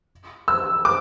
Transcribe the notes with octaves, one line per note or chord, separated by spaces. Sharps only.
E6
D6